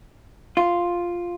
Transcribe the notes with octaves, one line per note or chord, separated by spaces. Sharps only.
F4